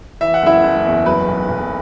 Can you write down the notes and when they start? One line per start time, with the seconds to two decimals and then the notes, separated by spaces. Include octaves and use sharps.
0.21 E3 E5
0.34 F#5
0.42 F#1 E4 E5
0.64 F#1
0.84 E2
1.05 F#3 B4
1.27 B1
1.48 B1